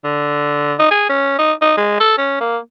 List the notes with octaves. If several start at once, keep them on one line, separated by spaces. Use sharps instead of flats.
D3
D#4
G#4
C#4
D#4
D#4
G#3
A4
C#4
A#3